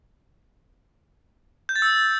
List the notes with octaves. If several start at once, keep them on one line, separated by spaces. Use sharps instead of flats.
G6
A6
E6